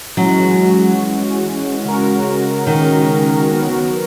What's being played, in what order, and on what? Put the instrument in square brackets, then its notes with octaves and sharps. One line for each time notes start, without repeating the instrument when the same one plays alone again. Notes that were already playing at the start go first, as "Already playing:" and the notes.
[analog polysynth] E3 G#3 C#4 F#4 [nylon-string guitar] F#3
[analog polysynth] C#3 G#3 C#4 F#4 A#4
[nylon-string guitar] D#3
[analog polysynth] F#3 B3 F#4 A#4